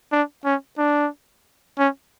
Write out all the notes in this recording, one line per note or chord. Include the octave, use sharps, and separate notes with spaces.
D4
C#4
D4
C#4